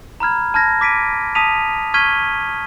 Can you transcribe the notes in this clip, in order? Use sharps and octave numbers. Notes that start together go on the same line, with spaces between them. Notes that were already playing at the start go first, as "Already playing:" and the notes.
A#5 B5 F6 G#6
A5 F6 G#6 A#6
D6 B6 D7 D#7
A5 D#6 B6 D#7 F7
C#6 F6 G#6 B6 D#7 G7